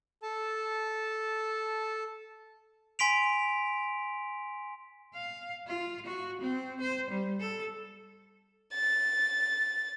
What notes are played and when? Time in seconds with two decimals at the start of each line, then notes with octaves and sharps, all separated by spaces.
0.23 A4 A5
2.99 G#5 C6 B6 D7 F7
5.13 F5
5.67 F4
6.06 F#4
6.41 C4
6.80 C5
7.10 G3
7.40 A4
8.73 A6